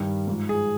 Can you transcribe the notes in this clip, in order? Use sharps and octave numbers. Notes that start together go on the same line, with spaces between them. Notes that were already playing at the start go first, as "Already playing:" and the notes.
Already playing: G2 D#3 G3
G#2 F3
G#4